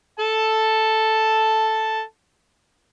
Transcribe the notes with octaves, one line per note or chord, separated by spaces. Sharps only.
A4 A5